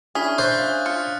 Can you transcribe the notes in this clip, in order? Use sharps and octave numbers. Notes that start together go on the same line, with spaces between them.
C#4 D4 E4 G#4 D#6 F6 B6
C5 F#6 A6
F5 G#5
F4 C#7